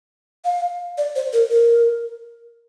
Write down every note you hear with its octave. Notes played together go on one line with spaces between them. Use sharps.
F5
D5
C5
A#4
A#4